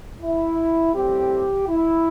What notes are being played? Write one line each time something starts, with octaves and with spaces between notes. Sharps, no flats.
E4
A2 G3 C4 G4
E4